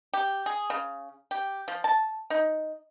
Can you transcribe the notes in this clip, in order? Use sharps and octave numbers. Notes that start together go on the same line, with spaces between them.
G4
G#4
C#3
G4
F3
A5
D#4